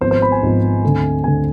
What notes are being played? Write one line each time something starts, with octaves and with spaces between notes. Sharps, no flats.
G#1 G#2 F3 B3 C5
C5
B5
G#5
G#1 G#2 F3 B3
D2 D3 A3 C4
D2 D3 A3 C4 G#5